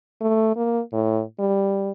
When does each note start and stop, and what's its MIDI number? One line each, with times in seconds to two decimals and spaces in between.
0.21 0.55 57
0.56 0.81 58
0.93 1.22 45
1.40 1.91 55